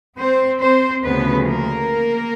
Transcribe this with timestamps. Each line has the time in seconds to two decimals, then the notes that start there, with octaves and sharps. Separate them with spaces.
0.17 C4 C5
0.60 C4 C5
1.03 D2 C#3 F3 B3 B4
1.47 A#3 A#4